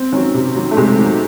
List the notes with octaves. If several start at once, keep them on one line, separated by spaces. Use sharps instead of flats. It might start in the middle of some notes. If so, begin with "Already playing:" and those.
Already playing: C4
D#3 F#3 C#4
C3
D#3 F#3
A3
C3 G#3
D#3 F#3